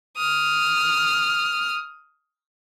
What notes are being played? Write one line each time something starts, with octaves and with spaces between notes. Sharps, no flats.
D#6 F6